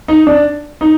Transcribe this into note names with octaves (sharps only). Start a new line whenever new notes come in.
D#4
D4
D#4